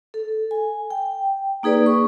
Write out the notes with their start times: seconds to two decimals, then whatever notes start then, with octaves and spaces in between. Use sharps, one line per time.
0.14 A4
0.51 G#5
0.90 G5
1.63 A#3 D#4 G#4 B4 D5
1.86 C#6